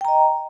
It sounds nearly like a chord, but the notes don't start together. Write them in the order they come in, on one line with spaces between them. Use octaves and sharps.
G5 A#5 D#5